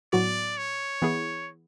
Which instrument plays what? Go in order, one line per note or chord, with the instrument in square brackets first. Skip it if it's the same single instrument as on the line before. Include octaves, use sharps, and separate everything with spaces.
[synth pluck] A2 F#3 B3 F#4 [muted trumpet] D5
[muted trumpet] C#5
[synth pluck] E3 B3 E4 G#4